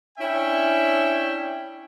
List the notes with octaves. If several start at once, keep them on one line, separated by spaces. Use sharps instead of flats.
C#4 D4 E4 C#5 E5 G5